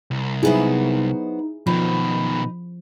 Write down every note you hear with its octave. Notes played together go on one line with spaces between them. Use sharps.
C2
F#3 B3 D#4 E4 G#4 C5
B2 D#3 F3 D#4 B5